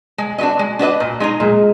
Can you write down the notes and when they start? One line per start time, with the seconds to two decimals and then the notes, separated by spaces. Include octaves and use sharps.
0.18 G#3
0.38 D4 F#4 B4 D#5
0.59 G#3
0.79 D4 F#4 B4 D#5
1.00 A#2
1.20 G#3 D#4 G#4
1.40 A#2 G#3